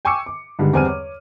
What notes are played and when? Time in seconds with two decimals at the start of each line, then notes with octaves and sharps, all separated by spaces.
0.05 G5 G#5 C#6 D6 E6 C#7
0.26 D6
0.59 G2 D3 D#3 G3 G#3
0.73 E2 G3 C4 G#5 F6 D#7
0.86 C#5 D6